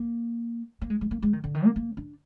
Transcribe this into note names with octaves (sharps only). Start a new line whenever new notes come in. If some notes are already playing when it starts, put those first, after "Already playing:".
Already playing: A#3
A#3
G#3
G#3
A#3
G#3
D#3
D3
D#3
A#3
A#3
D4